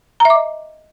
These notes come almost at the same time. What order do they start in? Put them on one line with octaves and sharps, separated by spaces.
A#5 E5 D6 D#5